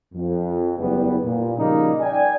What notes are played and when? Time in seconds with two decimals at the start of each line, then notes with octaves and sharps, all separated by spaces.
0.14 F2
0.77 F#1 E2 G3 B3
1.23 A#2
1.57 C#3 F3 G3 A#3 D#4
2.01 D5 G5 G#5